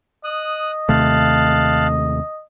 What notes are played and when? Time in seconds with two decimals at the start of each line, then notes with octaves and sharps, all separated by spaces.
0.24 D#5 D#6 F#6
0.89 D#2 C3 A3 F5 A5 F#6